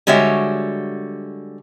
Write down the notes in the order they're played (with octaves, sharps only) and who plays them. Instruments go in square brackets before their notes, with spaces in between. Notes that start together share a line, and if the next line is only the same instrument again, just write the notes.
[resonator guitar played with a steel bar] D3 G3 G#3 F#4 C#5 E5